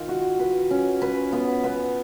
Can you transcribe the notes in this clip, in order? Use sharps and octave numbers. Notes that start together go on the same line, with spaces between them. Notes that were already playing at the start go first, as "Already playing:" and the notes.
Already playing: D#3 F4
F#4
B4
C#4
B4
B3
B3